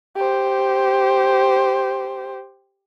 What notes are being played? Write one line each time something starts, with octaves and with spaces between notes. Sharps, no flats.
G4 C5